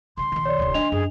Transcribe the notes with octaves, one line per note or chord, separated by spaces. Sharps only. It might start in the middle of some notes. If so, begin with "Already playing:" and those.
C#3 G3 C6
A#1 D#3
C#5 D5
D1 C#3
E3 A#3 D4 D#5 F7
F#2 G#4